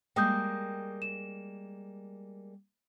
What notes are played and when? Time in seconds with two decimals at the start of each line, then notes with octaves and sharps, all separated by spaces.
0.16 G3 G#3 A#3 G5 D#6 G6
1.02 E7